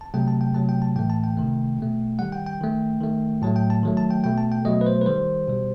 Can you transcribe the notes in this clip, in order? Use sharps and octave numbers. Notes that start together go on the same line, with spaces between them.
A5
C3 F#3 A3 G5
A5
G5
C3 F#3 A3 A5
G5
A5
A2 E3 A3 G5
A5
G5
C3 D#3 A3
B2 A3
D#3 G3 F#5
G5
G5
D#3 A3
D#3 A3
A2 F#3 A3 A5
G5
A5
D#3 F#3 A3
A5
G5
B2 A3 G5
A5
G5
B2 F#3 A3 D#5
B4
C5
B4
D#3 G3 C5
B2 G3